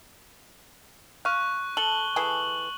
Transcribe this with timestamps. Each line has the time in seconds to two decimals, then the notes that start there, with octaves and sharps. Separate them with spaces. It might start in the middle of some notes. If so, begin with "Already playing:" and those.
1.25 F5 C#6 F#6
1.77 A4 F#7 G7
2.16 E3 G#4 A4